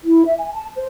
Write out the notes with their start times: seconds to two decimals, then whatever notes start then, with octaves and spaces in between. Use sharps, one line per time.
0.05 E4
0.25 E5
0.39 G#5
0.54 A5
0.75 C5